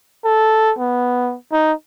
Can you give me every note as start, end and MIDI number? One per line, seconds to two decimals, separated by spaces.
0.24 0.73 69
0.79 1.36 59
1.52 1.72 63